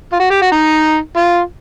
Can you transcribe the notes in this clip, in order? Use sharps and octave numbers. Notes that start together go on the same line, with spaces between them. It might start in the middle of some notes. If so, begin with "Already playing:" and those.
F4
F#4
G4
F#4
D#4
F4